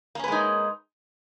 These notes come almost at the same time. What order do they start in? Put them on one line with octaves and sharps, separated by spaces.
A#3 C#4 B4 G#3 D#4